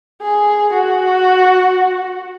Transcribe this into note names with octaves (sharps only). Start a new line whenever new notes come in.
G#4
F#4